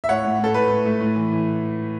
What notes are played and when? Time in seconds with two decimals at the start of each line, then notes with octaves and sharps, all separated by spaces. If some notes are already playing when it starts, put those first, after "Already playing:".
0.04 E5
0.08 A2 C#5 F#5
0.25 A2
0.39 A2 A4
0.54 A3 B4
0.70 A2
0.85 A3
1.00 A2
1.16 E3
1.32 E3